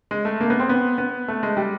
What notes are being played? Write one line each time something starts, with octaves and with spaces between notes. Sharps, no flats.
G#3
A3
A#3
B3
C4
B3
B3
A3
G#3
G3